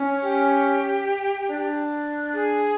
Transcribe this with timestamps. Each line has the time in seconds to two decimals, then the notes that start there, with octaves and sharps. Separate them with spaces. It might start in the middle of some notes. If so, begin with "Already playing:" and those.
Already playing: C#4
0.22 G4
1.49 D4
2.34 G#4